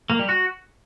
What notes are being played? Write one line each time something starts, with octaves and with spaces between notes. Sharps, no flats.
A#3
G3
F#4